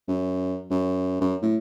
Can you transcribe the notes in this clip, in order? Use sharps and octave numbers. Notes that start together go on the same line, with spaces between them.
F#2
F#2
F#2
A2